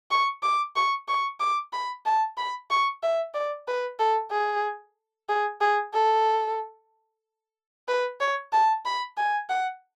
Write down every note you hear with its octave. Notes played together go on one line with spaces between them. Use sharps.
C#6
D6
C#6
C#6
D6
B5
A5
B5
C#6
E5
D5
B4
A4
G#4
G#4
G#4
A4
B4
C#5
A5
B5
G#5
F#5